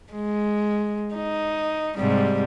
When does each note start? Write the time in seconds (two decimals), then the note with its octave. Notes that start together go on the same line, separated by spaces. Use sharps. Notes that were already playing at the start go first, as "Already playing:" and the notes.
0.13 G#3
1.15 D#4
1.98 G#2 C3 G3